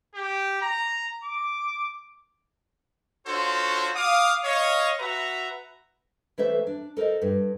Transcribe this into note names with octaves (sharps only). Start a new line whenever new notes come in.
G4
A#5
D6
D4 F4 F#4 A4 C5 C#5
F5 D6 D#6
C#5 D#5 F5
F#4 B4 E5 A#5
E3 A3 A4 B4 C5 E5
D4
A4 A#4 C5 D#5
G2